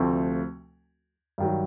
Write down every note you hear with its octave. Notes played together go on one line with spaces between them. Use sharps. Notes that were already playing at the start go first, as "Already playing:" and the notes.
Already playing: D2 C3 F3 A3 C4
G2 D#3 F#3